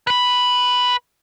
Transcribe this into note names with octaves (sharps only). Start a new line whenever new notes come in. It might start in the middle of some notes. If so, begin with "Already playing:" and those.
B4 B5